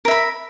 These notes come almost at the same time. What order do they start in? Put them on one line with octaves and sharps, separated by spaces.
A#4 E5 B5